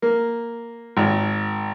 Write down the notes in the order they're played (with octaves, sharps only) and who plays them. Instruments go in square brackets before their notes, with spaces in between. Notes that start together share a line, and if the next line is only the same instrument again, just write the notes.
[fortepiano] A#3
G#1